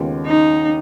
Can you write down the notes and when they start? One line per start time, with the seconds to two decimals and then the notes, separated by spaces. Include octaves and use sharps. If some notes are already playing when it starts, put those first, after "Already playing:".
Already playing: D#2 C#3 G#3 B3 F4
0.26 D#4